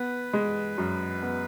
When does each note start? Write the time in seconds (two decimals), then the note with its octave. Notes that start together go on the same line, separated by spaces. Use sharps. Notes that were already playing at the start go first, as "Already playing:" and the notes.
Already playing: B3 B4
0.33 G#3
0.78 F#2
1.22 B3